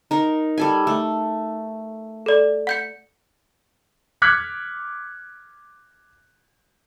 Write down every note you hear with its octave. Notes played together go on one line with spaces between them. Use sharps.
D#4 A#4
G3 A4 G#5
A3
A4 D5
F#5 G6 C#7
D6 F6 F#6 G#6 B6 C#7